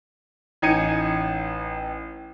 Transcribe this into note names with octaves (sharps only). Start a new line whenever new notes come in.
A1 D#4 G#5 G#6 C#7 D#7